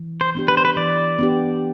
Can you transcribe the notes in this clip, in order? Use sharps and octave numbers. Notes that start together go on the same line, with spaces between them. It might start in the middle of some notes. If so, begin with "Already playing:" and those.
Already playing: E3
C5
B3 D4 G4
B4
C5
B4
E3 D5
B3 D4 G4